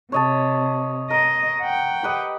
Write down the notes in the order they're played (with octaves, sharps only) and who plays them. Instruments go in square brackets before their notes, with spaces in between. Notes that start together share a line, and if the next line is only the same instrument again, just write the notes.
[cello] C3 [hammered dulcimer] C#5 D#5 A5
[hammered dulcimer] A#4 [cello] D#5
[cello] F#5 G5
[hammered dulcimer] G4 B4 D#5